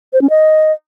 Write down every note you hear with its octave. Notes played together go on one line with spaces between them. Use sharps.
C5
C#4
D#5